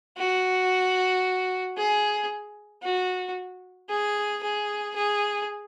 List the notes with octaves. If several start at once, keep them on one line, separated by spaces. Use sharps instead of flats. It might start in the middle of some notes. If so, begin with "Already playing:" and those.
F#4
G#4
F#4
G#4
G#4
G#4